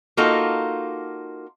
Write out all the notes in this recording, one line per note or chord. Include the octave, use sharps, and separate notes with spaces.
A#3 D#4 F4 F#4 A4